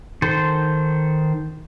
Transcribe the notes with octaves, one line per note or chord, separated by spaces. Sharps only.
D#3 A4 C5